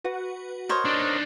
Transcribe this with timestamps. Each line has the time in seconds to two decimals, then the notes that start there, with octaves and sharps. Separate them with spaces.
0.04 F#4 B4 F#5
0.69 A#4 C5 C#5 D#5
0.85 D4 D#4